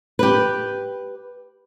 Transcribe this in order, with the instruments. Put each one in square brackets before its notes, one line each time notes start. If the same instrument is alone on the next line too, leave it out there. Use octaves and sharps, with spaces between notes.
[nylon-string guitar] G4 B4